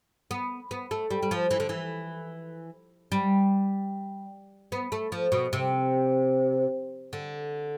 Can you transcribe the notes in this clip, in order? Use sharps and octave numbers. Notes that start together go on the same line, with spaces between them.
B3
B3
A3
G3
G3
F3
E3
D3
E3
G3
B3
A3
F3
B2
C3
D3